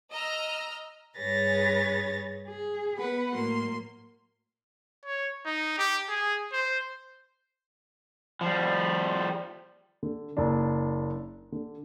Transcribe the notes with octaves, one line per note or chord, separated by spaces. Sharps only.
D#5 A#5 E6 F6
G2 G#4 B4 C#5 A6 A#6
G#4
B3 B4 F#5 B5
A2 F#3 A#3 C6
C#5
D#4
G4
G#4
C5
F3 G3
D3
F#1 D4
D3